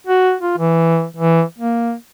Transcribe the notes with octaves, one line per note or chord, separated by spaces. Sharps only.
F#4
F4
E3
E3
A#3